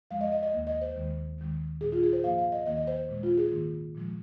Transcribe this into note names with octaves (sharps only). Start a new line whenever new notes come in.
F2 F3 G#3 F5
D#5
D#5
D#5
D#2 D#3 A#3
D#5
C5
D#2 D#3 G#3
D#2 D#3 G#3
A#2 G#3 G#4
F4
G#4
C5
G#2 F3 A#3 F5
F5
D#5
D#2 D#3 A#3 D#5
D#5
C5
A#2 G#3
F4
G#4
G#2 D#3 A#3
A#2 F3 G#3